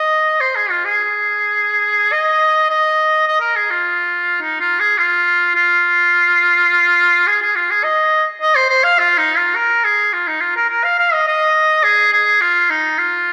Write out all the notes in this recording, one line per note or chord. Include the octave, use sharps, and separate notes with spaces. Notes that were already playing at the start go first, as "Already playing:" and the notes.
Already playing: D#5
C5
G#4
F4
G#4
D#5
D#5
D#5
A#4
G#4
F4
D#4
F4
G#4
F4
F4
G#4
G#4
F4
G#4
D#5
D#5
C5
C5
F5
F4
D#4
F4
A#4
G#4
F4
D#4
F4
A#4
A#4
F5
F5
D#5
D#5
G#4
G#4
F4
D#4
F4